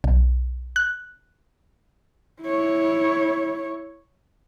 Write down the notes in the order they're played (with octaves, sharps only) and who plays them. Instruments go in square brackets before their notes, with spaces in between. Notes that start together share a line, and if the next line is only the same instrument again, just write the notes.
[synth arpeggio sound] B1
F#6
[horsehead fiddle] E4 C#5